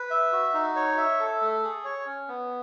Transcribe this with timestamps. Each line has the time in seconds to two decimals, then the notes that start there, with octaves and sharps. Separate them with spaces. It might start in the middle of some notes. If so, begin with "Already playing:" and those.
Already playing: B4
0.10 E5
0.32 F#4
0.54 D#4
0.76 C#5
0.97 E5
1.20 A4
1.42 A3
1.63 G#4
1.84 C#5
2.06 C#4
2.29 B3